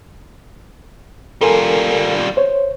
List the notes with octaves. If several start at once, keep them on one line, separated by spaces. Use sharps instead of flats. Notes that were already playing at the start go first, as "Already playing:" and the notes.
G3 F4 A4 A#4 G#5
C5 C#5